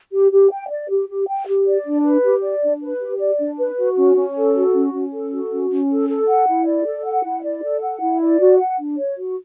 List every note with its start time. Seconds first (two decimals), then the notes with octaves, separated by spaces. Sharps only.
0.12 G4
0.31 G4
0.51 G5
0.69 D5
0.89 G4
1.08 G4
1.27 G5
1.46 G4
1.66 D5
1.85 D4
2.04 B4
2.24 G4
2.42 D5
2.62 D4
2.81 B4
3.00 G4
3.20 D5
3.39 D4
3.58 B4
3.78 F#4
3.97 C#4
4.16 C#4
4.36 A4
4.55 F#4
4.74 C#4
4.93 C#4
5.13 A4
5.32 F#4
5.51 C#4
5.70 C#4
5.89 A4
6.09 A4
6.28 F#5
6.47 E4
6.66 D5
6.85 A4
7.05 F#5
7.24 E4
7.43 D5
7.63 A4
7.81 F#5
8.01 E4
8.20 D5
8.39 F#4
8.58 F#5
8.78 D4
8.97 C#5
9.17 F#4